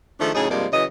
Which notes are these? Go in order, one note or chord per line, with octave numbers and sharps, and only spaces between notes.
D#3 F3 G#3 A3 D4
A2 C#3 F#3 D#4 G#4
G2 C3 F3 G#3 A#3 D5
C#3 E3 F#3 D#5